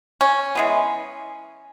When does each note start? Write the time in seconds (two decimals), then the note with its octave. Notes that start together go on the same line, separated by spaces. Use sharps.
0.21 C#4
0.55 E3 G#3 B3